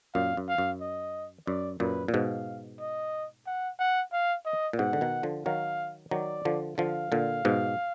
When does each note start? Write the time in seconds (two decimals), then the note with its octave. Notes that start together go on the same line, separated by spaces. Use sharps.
0.14 F#2 A#2 F5
0.37 F#2
0.48 F5
0.58 F#2
0.81 D#5
1.47 F#2 D5
1.80 F#2 A#2 B4
2.08 A#2
2.13 G#2 B2 F5
2.80 D#5
3.47 F#5
3.79 F#5
4.13 F5
4.46 D#5
4.73 A#2
4.79 G#2 B2 F#5
4.93 D3
5.01 B2 D#3
5.23 D3 F3
5.46 D#3 F#3 F5
6.11 D#3 F#3 D5
6.45 D3 F3
6.78 D3 F3 F5
7.12 A#2 D3
7.45 G#2 B2